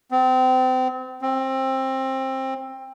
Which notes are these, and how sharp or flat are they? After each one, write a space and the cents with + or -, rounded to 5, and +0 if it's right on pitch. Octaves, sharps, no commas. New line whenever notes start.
C4 -30
C4 +20